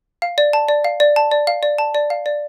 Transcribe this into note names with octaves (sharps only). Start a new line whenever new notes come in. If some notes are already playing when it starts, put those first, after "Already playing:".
F5
D5
A5
D5
F5
D5
A5
D5
F5
D5
A5
D5
F5
D5